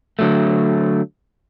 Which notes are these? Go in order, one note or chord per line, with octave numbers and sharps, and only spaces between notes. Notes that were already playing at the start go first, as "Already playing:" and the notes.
D3 F#3 A3